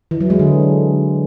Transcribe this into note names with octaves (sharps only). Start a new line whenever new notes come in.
E3
F#3
G#3
D3